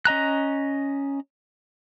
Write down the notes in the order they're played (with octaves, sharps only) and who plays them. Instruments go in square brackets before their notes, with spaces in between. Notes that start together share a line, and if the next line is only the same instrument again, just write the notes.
[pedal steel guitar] C#4 D#5 A#5 F#6